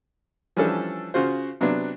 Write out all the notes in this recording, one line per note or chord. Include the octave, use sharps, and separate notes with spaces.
E3 F3 G3 C#4 D4 A4
C#3 F4 F#4 C5
C3 F#3 B3 D4